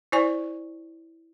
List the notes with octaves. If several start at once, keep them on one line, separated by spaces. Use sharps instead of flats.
E4 C5 D5 G#5 C#6